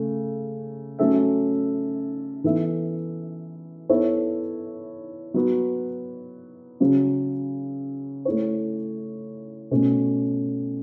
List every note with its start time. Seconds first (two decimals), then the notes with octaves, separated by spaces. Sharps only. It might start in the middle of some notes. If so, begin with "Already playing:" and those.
Already playing: C#3 A3
0.99 F#3 A3 C#4 A4 E5
2.44 E3 B3 A4 E5
3.89 B3 E4 A4 C#5 E5
5.34 F#3 B3 F#4
6.80 C#3 F#3 C#4
8.25 A3 E4 C#5
9.71 B2 A3 C#4